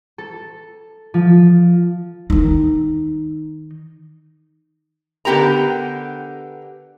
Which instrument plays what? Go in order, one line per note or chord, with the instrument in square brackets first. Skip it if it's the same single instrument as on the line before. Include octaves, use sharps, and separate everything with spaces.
[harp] A4
F3
[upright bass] D#3 D#4
[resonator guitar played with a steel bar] D3 B3 G4 A#4 A#5